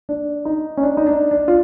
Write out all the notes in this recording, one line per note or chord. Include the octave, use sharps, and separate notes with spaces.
D4
D#4
C#4
D4
D#4
D4
D4
F4